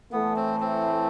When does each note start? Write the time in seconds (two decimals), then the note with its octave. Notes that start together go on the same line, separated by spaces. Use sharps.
0.12 A2 E3 A3 B3
0.36 C4
0.60 C4